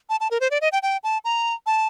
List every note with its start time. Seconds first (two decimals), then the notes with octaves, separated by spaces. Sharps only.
0.10 A5
0.20 A5
0.31 A#4
0.40 C5
0.51 D5
0.61 D#5
0.72 G5
0.83 G5
1.03 A5
1.25 A#5
1.66 A5